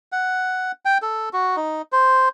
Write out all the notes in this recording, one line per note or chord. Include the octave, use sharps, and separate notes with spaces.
F#5
G5
A4
F#4
D#4
C5